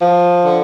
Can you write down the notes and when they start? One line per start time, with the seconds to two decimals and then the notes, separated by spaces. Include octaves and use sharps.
0.01 F3
0.45 D3